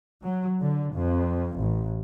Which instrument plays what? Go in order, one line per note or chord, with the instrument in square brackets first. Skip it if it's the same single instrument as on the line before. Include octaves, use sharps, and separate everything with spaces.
[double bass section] F#3
D3
F2
A1